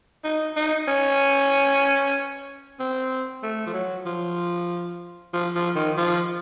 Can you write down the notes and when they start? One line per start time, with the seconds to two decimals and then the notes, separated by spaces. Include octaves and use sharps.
0.24 D#4
0.56 D#4
0.88 C#4
2.79 C4
3.43 A3
3.66 F3
3.74 F#3
4.06 F3
5.33 F3
5.55 F3
5.76 D#3
5.97 F3